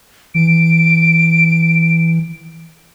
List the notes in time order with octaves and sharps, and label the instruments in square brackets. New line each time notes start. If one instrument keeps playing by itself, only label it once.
[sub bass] E3 [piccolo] D7